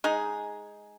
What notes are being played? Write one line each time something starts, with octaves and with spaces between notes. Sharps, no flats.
G#3 D#4 G#4